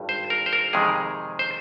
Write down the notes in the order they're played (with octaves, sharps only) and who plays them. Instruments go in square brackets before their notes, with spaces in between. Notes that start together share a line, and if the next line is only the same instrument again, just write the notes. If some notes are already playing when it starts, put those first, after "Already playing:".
Already playing: [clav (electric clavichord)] G#1 G2
C5
A#4
C5
A#4
F2 C3 D#3 G#3 G#4
C5